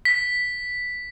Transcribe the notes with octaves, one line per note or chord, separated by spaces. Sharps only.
B6